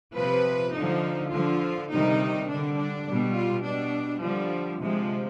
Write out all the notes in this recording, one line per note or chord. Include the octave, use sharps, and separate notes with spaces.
C3 F3 B4
D3 F3 D#4
D3 F3 F4
C3 D#3 G3 D#4
D3 G3 D4
D4
B2 G3
F4
B2 G3 D4
D3 F3 G3
C3 F3 G#3